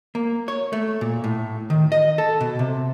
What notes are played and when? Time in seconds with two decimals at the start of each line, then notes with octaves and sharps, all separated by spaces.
0.15 A#3
0.48 C#5
0.73 A3
1.01 A#2
1.24 A2
1.70 D#3
1.92 D#5
2.18 A4
2.41 B2
2.59 C3